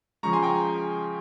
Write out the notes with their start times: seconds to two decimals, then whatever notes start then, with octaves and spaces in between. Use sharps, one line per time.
0.23 C#3 F3 G#3 A#5 C#6
0.33 G#5 C6
0.43 G5 A#5